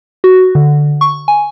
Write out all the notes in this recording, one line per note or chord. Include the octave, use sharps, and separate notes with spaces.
F#4
D3
C#6
G#5